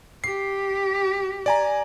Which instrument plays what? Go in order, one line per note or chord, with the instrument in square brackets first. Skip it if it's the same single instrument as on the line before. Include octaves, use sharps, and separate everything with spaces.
[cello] G4 [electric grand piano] C7
[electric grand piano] D5 G#5 A#5